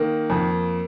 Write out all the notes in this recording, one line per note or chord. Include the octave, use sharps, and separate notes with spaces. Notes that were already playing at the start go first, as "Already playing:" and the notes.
Already playing: D#3 A#3
F2